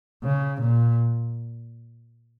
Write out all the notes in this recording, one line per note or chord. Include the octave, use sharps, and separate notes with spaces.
C#3
A#2